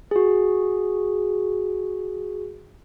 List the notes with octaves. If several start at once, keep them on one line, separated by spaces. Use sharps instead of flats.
F#4 G#4